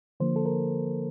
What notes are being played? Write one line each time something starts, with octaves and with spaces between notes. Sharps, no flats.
D3 F3 A#3 C5
A4
A#4